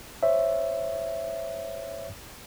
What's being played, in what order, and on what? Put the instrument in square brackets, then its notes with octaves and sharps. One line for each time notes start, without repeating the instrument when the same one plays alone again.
[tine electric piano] C5 C#5 E5